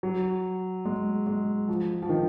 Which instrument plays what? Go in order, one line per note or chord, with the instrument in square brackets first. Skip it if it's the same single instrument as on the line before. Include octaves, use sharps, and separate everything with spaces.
[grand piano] F#3
G#3
G#3
F3
F3
D#3